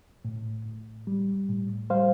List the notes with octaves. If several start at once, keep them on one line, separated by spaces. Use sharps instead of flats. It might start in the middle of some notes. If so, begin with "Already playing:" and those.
A2
A2
G3
A2
G3 C5 F5